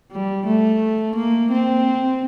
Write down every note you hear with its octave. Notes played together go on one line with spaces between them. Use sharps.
G3
A3
A#3
C4